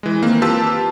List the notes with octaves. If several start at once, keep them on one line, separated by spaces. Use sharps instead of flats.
E3 G#3
D#3 A#3 C4
F4 G4 B4 A5 E6